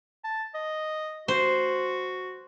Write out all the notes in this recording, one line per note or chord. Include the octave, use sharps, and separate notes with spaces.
A5
D#5
F#4 C5